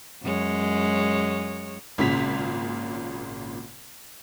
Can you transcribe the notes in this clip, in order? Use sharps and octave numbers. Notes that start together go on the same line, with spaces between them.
F#2 G#3 C#5
G#1 A#2 C#3 B6 F7